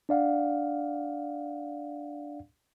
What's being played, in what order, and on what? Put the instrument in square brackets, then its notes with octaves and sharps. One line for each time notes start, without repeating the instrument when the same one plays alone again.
[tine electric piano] D4 D5 F5 F#5